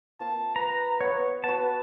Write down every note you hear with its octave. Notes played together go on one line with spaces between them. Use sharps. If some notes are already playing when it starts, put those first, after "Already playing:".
A#3 C4 F4 A5
B4 A#5
B3 C#5
B3 F#4 B4 A5